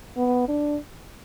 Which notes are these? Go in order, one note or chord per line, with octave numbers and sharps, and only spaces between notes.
B3
D4